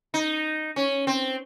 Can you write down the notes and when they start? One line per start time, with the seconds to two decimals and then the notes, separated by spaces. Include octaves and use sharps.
0.14 D#4
0.76 C#4
1.07 C4